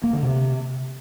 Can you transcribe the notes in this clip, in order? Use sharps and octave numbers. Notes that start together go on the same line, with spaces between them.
A#3
D3
C3